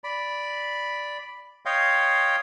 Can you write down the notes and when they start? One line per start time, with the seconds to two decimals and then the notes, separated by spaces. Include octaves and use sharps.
0.04 D5 B5
1.66 C#5 D#5 F5 G5 C6